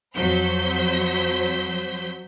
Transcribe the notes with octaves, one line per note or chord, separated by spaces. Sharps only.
F2 F#3 C5 G6 B6